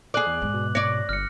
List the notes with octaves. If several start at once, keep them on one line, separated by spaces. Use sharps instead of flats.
A3 G#4 D5 D6 F#6 F#7
E2
G#2
B2
C#5 D5 A#6
G1 F6 C#7